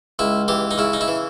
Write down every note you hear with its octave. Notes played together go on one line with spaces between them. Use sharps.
C#2 E4
E3 G4
D#4
C#3 E4
D#4
E4
E3